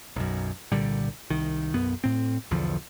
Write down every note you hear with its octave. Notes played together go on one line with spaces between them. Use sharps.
B1 F#2
C2 A#2 D3 G3
C2 D#3
B1 F#2 B3
A2 C4
B1 E2 D3 F3